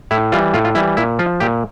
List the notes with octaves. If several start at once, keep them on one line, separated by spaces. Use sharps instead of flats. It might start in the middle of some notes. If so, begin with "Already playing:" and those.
A2 E4
E3 G3 F4
A2 F4
F4
E3 G3 E4
A#2 E4
F3 F4
A#2 G4